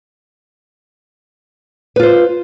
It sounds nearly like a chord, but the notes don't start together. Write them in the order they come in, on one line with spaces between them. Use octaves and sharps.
B4 F4 C5